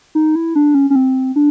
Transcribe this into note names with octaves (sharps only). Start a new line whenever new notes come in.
D#4
E4
D4
C#4
C#4
C4
D4